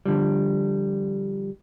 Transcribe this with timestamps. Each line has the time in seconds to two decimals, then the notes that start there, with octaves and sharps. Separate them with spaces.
0.06 D3 F3 G3